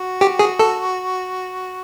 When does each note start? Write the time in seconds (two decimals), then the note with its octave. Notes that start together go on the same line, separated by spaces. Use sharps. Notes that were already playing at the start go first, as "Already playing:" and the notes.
Already playing: F#4
0.21 G4
0.39 G#4
0.59 A4